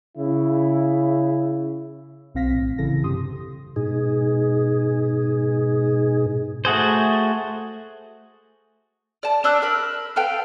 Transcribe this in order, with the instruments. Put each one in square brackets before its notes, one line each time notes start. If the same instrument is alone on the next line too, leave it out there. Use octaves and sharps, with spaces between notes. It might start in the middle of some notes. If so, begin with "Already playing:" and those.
[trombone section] C#3 E4
[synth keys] B1 B2 C4 F5 A#6 B6
A1 A2
C#3 E3 E4 A4 A#6
G2 C3 G4 C6 D#6
[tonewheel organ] G#2 B2 D#4 G#4
[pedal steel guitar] A3 F#4 G#4 C5
[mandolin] D5 A5
D4 D5 E6 F#6
A#4 B5
A4 B4 F5 G5